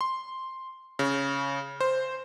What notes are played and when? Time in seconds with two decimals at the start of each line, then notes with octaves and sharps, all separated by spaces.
0.01 C6
0.99 C#3
1.81 C5